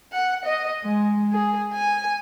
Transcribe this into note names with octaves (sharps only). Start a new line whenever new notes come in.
F#5
D#5
G#3
G#4
G#5